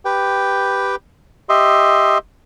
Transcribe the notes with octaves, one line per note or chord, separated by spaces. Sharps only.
G4 B4 G5
G4 D#5 E5 C6